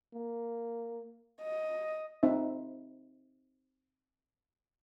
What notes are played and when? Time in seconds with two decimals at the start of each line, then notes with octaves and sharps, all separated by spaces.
0.14 A#3
1.42 D#5
2.23 C4 D#4 E5